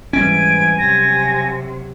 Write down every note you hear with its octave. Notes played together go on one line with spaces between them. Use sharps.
G#2 E3 G3 C4 C#4 G#5 D7
C3 F#3 A#6